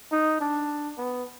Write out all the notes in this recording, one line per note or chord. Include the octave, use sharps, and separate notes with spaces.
D#4
D4
B3